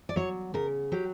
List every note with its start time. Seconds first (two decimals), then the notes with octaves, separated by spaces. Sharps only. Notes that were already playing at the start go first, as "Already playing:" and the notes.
0.09 D5
0.16 F#3 C#5
0.54 C#3 A#4
0.92 F#3 G4